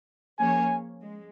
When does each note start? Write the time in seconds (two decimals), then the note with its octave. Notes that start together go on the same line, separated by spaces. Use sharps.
0.38 F3 A#3 C#4 G#4 C#5 G#5
1.02 G#3